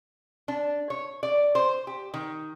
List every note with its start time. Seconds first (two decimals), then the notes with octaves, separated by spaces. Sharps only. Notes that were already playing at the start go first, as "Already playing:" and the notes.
0.48 D4
0.90 C#5
1.23 D5
1.55 C5
1.87 G4
2.14 D#3